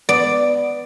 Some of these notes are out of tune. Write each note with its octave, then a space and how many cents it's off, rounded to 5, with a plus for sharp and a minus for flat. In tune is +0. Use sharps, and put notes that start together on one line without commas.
B3 +0 D5 +5